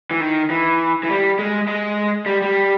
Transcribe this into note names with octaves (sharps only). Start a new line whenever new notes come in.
E3
D#3
E3
E3
G3
G#3
G#3
G3
G3